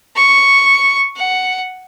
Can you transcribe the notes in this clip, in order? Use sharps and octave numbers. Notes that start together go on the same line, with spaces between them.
C#6
F#5